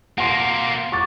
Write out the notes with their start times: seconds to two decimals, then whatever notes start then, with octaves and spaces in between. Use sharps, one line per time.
0.18 B2 A#3 F#5 C6 C7
0.92 C#6 D6 A6